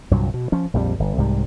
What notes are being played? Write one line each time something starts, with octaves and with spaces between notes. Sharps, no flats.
C2 G2 A#2 F#3
B2
F3 C#4
A#1 F2 D#3 G3
G1
C2 G#2 C3 G3